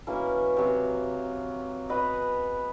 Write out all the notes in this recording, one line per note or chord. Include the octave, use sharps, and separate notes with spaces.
B2 E3 A#3 C#4
C3 F#3
B3 G#4 B4 D#5